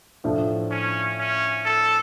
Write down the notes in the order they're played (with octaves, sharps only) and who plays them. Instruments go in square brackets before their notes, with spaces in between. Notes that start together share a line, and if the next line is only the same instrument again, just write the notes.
[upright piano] A2 F3 A3 D4
[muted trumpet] C#4
C#4
A4